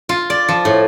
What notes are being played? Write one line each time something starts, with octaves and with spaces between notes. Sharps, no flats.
F4
D5
F3
A2